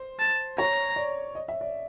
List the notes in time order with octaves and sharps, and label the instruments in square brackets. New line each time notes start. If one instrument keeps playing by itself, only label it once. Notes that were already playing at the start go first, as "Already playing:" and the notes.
Already playing: [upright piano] C5
[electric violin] A5
[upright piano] C#5 [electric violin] A#5
[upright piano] D5
D#5
E5
D5